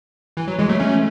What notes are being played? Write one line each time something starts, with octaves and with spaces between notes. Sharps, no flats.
E3
F#3
E3 G#3
F#3 A3
A3 C#4